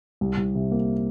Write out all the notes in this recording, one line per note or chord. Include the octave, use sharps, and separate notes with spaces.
C2
C2
C3
A#3